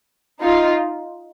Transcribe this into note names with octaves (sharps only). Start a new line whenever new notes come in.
D#4 F4